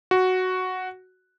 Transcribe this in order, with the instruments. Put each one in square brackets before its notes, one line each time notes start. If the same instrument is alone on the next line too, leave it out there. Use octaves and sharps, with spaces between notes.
[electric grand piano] F#4